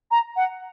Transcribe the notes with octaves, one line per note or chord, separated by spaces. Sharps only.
A#5
F#5